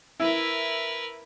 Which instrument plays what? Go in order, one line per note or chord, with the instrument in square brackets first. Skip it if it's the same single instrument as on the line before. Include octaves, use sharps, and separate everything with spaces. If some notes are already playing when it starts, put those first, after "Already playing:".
[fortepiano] E4 [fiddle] A#4 B4